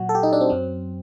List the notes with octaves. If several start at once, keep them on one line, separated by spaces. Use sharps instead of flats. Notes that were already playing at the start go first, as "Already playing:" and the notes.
Already playing: A#2 F#3 F#4
A4
G4
D#4
D4
C4
F#2 F#3